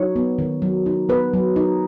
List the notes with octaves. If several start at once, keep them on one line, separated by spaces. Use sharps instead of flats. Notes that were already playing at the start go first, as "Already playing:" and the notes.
Already playing: F#3 D#4 C#5
B3
D#3
F#3
D#4
B3 B4
F#3
D#4